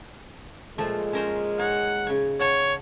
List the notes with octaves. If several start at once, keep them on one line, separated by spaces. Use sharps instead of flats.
A#2 F3 G#3 A3
C#4 A#4 C5
D#4 C#5 F#5
C#3 C#5
C#5 F#5 A5